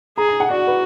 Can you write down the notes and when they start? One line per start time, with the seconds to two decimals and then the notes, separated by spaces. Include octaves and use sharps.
0.18 G#4 A#5
0.29 A#5
0.40 F#5
0.50 F#4 D5
0.67 B4